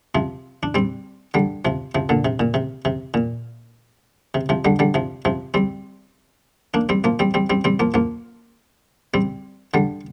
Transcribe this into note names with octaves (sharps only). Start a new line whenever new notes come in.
C3 F3
D4
G3 C4
D3 G3
C3 F3
C3 F3
A#2 D3
C3
A#2
C3
C3
A#2
C3
C3 F3
D3 G3
D3 G3
C3 F3
C3 F3
G3 C4
A#3 D4
G3 C4
F3 A#3
G3 C4
G3 C4
G3 C4
G3 C4
F3 A#3
F3 A#3
G3 C4
D3 G3